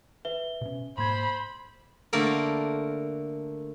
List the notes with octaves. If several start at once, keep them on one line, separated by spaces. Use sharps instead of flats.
B4 E5 G7
B2 C#4
G#2 A#3 C5 B5 C6 G#6
D3 A3 A#3 A4 A#4